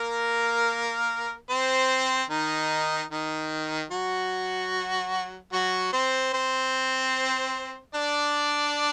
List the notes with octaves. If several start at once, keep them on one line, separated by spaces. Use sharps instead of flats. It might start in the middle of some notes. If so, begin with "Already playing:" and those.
Already playing: A#3 A#4
C4 C5
D#3 D#4
D#3 D#4
F#3 F#4
F#3 F#4
C4 C5
C4 C5
D4 D5